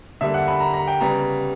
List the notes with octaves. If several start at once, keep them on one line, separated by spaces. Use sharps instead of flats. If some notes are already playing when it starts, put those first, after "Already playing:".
D3 G3 A#3 E5
F#5
B5
A#5
A#5
G5
C#3 G3 B3 A#5